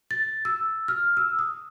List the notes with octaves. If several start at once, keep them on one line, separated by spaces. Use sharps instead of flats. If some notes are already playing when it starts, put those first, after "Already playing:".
A6
E6
F6
E6
D#6